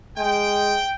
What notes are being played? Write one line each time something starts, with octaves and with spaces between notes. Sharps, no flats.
G#3 G5